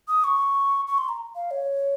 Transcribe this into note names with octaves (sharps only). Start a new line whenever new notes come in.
D#6
C#6
C#6
C6
A#5
F5
C#5